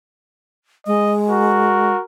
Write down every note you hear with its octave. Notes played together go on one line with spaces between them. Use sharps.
G#3 D#5
F#4 A#4